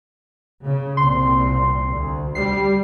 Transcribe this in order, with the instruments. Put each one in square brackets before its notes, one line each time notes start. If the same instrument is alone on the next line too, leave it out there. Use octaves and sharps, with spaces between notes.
[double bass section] C#3
[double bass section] C2 A#2 C4 [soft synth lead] C6
[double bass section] D2
[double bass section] G3 [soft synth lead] C7